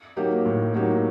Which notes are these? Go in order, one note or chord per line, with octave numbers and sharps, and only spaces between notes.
F#3 A#3 D#4 G4
A2
F#3 A#3 D#4 G4